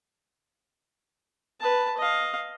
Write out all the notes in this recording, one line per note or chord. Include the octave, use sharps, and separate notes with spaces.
B4 A5
D#5 F5